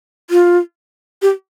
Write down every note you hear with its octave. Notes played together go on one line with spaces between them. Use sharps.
F4
G4